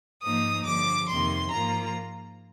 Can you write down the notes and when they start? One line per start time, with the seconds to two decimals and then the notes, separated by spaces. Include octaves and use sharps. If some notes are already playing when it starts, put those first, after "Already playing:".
0.23 G#2 F3 A#3 D#4 D#6
0.65 G2 D3 F3 D6
1.08 F2 C3 D#3 A#3 C6
1.51 G#2 F3 A#3 F4 A#5